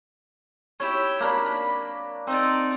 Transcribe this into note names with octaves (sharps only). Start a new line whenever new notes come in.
E4 G4 C#5
A#3 D4 B5
C4 D#4 D5